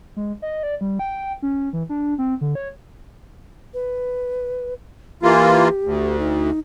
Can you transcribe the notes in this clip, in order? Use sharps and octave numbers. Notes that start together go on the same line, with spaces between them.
G#3
D#5
D5
G3
G5
C#4
E3
D4
C4
D3
C#5
B4
E3 A#3 F4 G4
D2
D#4